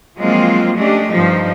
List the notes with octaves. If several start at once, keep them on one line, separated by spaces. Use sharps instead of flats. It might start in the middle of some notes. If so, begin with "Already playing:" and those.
F3 F#3 G#3 A#3 C4 F4
G#3 A3 C#4 D4 G4
G2 F3 D#4